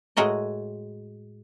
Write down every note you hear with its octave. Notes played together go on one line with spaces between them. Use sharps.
A2 G#3 F#4 A#4 D#5